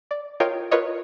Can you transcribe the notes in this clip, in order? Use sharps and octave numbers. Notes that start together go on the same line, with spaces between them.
D5
F4 A#4 C#5 D#5 G5
F4 A#4 B4 C#5 D#5